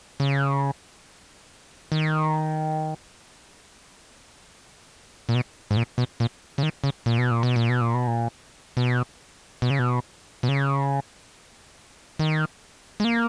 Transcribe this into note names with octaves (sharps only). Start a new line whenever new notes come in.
C#3
D#3
A#2
B2
G#2
A#2
B2
A#2
C#3
D#3
C#3
A#2
B2
A#2
B2
A#2
B2
A#2
B2
A#2
B2
B2
C#3
B2
B2
C#3
D#3
G#3
A#3